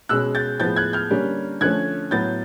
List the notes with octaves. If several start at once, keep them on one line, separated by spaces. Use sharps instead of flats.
B2 G#3 C#4 E6 F#6
G6 A6
A2 F3 G#3 B3 G6 A6
F#6 G#6
F6 G6
D3 G3 A#3 C#4
D3 F3 A3 C#4 F#6 G#6
A2 F#3 B3 G6 A6